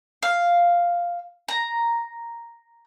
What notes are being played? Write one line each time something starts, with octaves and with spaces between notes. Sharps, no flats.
F5
A#5